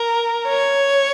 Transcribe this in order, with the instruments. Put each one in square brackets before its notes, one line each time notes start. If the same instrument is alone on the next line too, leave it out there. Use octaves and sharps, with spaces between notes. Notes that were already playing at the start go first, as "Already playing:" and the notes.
Already playing: [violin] A#4
C#5